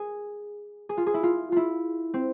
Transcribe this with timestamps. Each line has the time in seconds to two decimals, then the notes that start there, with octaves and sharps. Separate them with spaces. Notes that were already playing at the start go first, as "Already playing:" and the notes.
Already playing: G#4
0.89 G#4
0.97 F4
1.07 G#4
1.14 E4
1.23 F4
1.52 E4 F4
2.14 C4